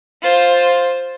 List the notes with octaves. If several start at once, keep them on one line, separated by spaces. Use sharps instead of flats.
F4 C5